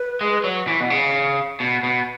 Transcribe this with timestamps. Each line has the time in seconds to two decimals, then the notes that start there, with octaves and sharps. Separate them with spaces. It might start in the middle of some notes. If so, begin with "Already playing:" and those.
Already playing: B4
0.21 G#3
0.44 F#3
0.67 E3
0.80 B2
0.90 C#3
1.60 B2
1.83 B2